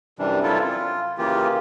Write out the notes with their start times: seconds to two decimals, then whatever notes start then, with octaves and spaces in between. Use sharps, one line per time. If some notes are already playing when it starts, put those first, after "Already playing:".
0.19 F#2 C3 E3 G3 D4
0.43 C3 F#3 G3 E4 F4 A4
0.62 F4
1.18 C#3 E3 A#3 F4 G4